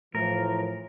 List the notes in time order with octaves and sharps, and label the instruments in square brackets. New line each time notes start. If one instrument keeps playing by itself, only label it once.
[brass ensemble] A2 E3 F3 [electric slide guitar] A#4